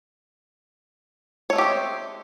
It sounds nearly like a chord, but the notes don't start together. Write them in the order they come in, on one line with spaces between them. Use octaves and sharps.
C#5 A3 G#3 G4 C4